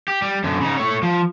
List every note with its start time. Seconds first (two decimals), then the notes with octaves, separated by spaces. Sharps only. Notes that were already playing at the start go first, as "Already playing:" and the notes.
0.08 G4
0.22 G3
0.44 F#2 D3
0.61 C#3 D#4
0.77 A3 C#5
1.03 F3